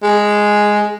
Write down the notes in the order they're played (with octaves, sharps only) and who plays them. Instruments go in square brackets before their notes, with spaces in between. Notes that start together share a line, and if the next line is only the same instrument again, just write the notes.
[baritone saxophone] G#3